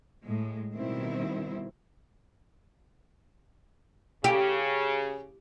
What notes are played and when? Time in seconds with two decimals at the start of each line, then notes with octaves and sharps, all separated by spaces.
0.24 A2 G#3
0.75 B2 D#3 G3 C4 E4
4.24 C#3 G4